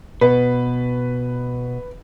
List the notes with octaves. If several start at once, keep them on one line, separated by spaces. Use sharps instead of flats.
B2 B4